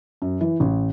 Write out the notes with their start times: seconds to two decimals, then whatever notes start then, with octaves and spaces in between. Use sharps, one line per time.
0.22 F#2
0.41 E3
0.60 A1